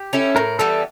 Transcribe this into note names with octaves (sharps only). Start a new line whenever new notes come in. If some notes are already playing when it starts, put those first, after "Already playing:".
Already playing: G4
C#4 E4 A4
A2 A#4
E3 G3 B3 A4